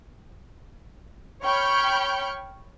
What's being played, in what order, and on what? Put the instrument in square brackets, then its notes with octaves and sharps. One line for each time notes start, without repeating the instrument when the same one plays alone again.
[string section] C#5 G5 B5 C#6 F6 G6